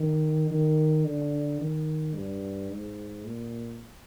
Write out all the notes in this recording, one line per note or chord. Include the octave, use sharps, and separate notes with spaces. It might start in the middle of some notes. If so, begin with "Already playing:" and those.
Already playing: D#3
D#3
D3
D#3
G2
G#2
A#2